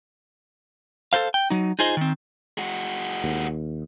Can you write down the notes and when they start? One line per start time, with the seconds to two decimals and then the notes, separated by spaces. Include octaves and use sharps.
1.13 A4 A#4 C5 F5
1.34 G5
1.50 F#3 D#4
1.79 D#4 F4 G#4 C5 D#5
1.97 D#3 C4
2.58 G#3 F#4
3.24 D#2